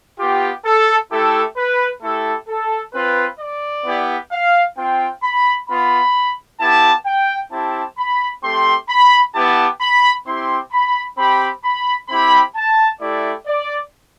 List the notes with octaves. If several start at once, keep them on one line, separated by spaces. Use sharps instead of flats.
B3 F4 G4
A4
A3 E4 G4 A4
B4
A3 E4 G4 A4
A4
C4 F4 B4
D5
B3 E4 G4
F5
C4 F4 G5
B5
B3 F4 B5
B3 E4 G4 A5
G5
C4 E4 G4 A5
B5
A3 C4 G4 C6
B5
B3 E4 G4 A5
B5
C4 E4 G4 C6
B5
C4 G4 B5
B5
C4 E4 G4 B5
A5
A3 E4 G4 D5
D5